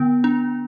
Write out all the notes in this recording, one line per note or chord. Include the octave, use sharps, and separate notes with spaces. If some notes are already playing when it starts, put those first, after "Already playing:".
Already playing: D3 B3
D4